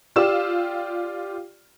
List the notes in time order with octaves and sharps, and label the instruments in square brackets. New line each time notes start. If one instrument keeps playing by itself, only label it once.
[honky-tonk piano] F4 G4 D5 E6 E7